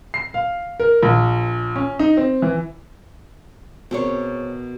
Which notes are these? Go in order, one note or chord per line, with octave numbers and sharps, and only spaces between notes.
C7
F5
A#4
A#1
C#4
D#4
C4
E3
B2 A#3 C4 G#4 C#5